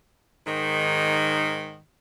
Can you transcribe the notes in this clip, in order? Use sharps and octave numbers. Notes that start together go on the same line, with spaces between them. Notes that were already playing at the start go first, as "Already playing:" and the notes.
G#2 D#3